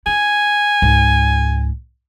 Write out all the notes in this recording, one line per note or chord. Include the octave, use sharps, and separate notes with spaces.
E4 G#5
C#2 G#2